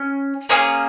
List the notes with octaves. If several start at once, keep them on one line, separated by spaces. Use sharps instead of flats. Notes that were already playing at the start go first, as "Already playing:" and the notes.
Already playing: C#4
A#3 C#4 G#4 D#6